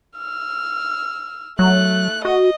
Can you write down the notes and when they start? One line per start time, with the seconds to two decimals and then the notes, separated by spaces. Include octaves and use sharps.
0.17 E6 F6
1.59 F#3 A3 F#6
2.25 F#4 D#5